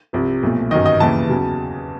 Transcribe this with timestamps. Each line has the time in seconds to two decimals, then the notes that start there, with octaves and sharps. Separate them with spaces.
0.13 C2 C3 F3
0.43 B1 A#2 F3 A3
0.71 G1 F#2 D#3 D#5
0.86 D#5
1.00 D#2 C#3 E3 A5
1.30 E2 C#3 F#3